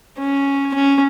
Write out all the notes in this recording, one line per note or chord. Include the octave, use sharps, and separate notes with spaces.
C#4
C#4